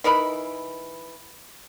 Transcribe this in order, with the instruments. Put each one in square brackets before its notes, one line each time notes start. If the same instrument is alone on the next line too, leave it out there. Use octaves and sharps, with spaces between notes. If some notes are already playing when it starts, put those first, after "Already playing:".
[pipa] E3 D#4 A#4 B5